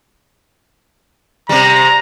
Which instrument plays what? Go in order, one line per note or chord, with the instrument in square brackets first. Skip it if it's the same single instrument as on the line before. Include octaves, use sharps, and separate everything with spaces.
[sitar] C3 G3 [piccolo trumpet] A#5